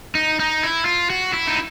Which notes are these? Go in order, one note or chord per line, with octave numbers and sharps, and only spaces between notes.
D#4
D#4
E4
F4
F#4
E4
D#4